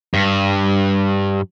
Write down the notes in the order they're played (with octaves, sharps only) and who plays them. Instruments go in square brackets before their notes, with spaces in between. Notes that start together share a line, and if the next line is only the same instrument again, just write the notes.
[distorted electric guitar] G2